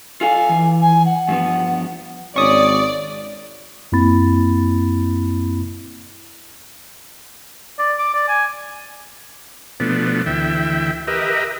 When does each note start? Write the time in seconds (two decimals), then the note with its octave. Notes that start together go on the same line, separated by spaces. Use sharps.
0.21 F4 A4 F5 G#5
0.49 E3
0.81 G#5
1.05 F#5
1.28 G2 F3 B3
2.36 G#1 C#4 D5 C#6 D#6
3.92 F#2 A#3 C4 E4 B5 A6
7.79 D5
7.98 D6
8.14 D5
8.28 G#5
9.80 B2 F3 A3 B3 D4
10.26 D2 E3 E5 G5
11.07 G4 A#4 B4 D#5 E5